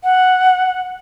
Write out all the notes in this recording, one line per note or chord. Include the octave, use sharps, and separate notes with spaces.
F#5